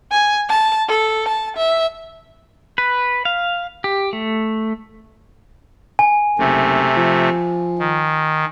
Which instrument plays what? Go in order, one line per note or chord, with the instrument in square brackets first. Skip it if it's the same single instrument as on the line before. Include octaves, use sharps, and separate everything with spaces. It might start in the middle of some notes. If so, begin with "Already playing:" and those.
[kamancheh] G#5
A5
A4
A5
E5
[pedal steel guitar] B4
F5
G4
A3
[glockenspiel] G#5
[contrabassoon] F#1 [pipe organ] C3 A3
[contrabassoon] F3
[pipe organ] D#3